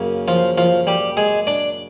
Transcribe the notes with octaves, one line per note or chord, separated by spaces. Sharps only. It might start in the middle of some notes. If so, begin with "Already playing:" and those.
Already playing: F#2 C#3 A#3
F3 F4
F3 F4
G3 G4
G#3 G#4
D4 D5